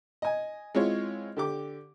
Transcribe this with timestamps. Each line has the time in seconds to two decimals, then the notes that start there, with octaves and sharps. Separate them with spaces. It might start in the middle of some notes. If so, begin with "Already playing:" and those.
0.22 D#5 G#5
0.75 G#3 C4 E4 F4 C#5
1.37 D3 G4 D6